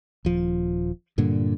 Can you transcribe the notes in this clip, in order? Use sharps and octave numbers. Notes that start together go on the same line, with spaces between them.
D#1 F3
G2 A#2 D3